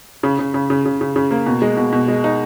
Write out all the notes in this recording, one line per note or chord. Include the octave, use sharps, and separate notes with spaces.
C#3
C#3
C#3
C#3
C#3
C#3
C#3
A#3
B2
G#3
B2
B2
G#3
D#4